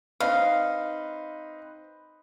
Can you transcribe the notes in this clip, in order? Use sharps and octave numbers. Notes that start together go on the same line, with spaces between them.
C4 D#4 B4 F5